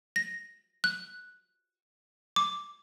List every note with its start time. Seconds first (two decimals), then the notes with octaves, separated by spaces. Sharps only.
0.16 A#6
0.84 F#6
2.36 D6